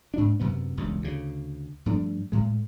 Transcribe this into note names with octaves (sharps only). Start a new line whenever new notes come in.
G#2 D4
F#2 C3 B3
E1 C#2 G2
D2 C#3
G2 F3 A3 D4
A2 G#3